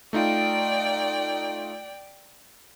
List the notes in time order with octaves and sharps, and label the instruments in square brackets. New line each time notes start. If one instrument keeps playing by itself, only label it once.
[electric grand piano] A3 D#4 F4 [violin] D5 G5